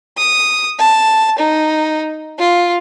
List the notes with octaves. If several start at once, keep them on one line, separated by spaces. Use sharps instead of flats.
D#6
A5
D#4
F4